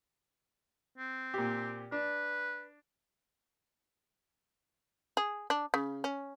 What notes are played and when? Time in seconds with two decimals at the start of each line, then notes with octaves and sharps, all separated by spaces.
0.98 C4
1.34 A#2 G4
1.92 D4 B4
5.17 G#4
5.50 D4
5.74 C#3
6.04 C#4